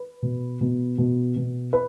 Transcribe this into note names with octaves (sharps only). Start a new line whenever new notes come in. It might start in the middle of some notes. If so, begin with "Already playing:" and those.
Already playing: B4
B2
B2
B2
B2
B4